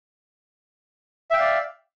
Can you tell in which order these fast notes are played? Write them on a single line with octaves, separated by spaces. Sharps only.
E5 G5 F5 D5